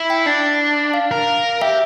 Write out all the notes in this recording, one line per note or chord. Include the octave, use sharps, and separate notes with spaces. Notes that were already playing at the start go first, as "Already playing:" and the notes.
Already playing: E4
G5
D4
F5
A#4
G4 E5